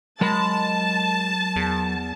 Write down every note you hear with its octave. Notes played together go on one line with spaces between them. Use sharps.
F#3 G#3 A#4 A5 B5
E2